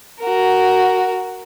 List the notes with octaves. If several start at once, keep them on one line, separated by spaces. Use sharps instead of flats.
F#4 A#4